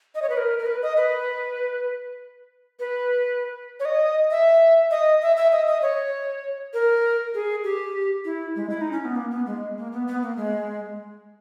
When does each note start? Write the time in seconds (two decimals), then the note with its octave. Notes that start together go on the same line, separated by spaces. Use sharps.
0.15 D#5
0.22 C#5
0.30 B4
0.37 A#4
0.59 A#4
0.66 B4
0.83 D#5
0.97 B4
2.80 B4
3.80 C#5
3.85 D#5
4.31 E5
4.91 D#5
5.22 E5
5.37 E5
5.52 D#5
5.67 D#5
5.82 C#5
6.74 A#4
7.34 G#4
7.64 G4
8.25 E4
8.56 G#3
8.70 E4
8.81 D#4
8.92 C#4
9.05 B3
9.16 A#3
9.31 B3
9.46 G#3
9.77 A#3
9.92 B3
10.07 B3
10.22 A#3
10.37 G#3